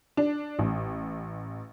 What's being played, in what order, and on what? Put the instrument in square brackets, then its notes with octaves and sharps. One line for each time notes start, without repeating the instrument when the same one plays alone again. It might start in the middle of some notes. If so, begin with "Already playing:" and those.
[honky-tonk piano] D4
A1